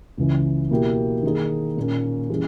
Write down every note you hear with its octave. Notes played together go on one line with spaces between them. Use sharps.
C#2 C#3 E3
B2 A#3 E4 G4 A#4
D#3 A#3 D#4 G#4
A#2 A#3 C#4
E3 G3 C#4 G#4